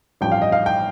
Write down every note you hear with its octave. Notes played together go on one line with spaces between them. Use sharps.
A1 G2 F3 G5
F5
D#5
F5
G5